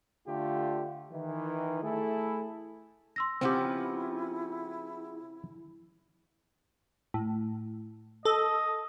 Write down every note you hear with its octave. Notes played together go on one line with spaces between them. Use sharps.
D3 A3 F4 G4
D#3 E3
A3 E4 G#4 A4
C6 E6 A#6
C#3 F3 B3 C4 E4 G4
A2
A4 D#5